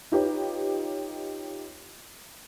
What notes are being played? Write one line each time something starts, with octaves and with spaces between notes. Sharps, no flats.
D#4 F4 G4 B4 C#5